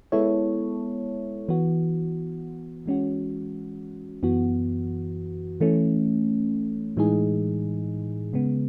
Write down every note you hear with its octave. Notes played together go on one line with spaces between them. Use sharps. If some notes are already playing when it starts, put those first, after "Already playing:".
G#3 B3 E4 A4 C#5
E3 B3 F#4
E3 G#3 C#4 F#4
F#2 E3 B3 F#4
E3 A3 C#4
A2 E3 G#3 D#4 G#4
C#3 G#3 B3